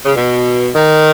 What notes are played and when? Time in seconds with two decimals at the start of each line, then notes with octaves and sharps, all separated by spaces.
0.06 C#3
0.16 B2
0.76 D#3